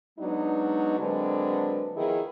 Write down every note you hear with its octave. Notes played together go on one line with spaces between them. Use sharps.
F#3 G#3 B3 D4 D#4
D3 F#3 G#3 A#3 C4 B4
D#3 F3 B3 D#4 E4 G#4